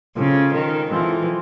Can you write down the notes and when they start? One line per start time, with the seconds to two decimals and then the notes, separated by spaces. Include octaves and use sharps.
0.16 C#3 G#3 C4 F4 A4
0.54 D#3
0.90 E3 G#3 C4 F4 A4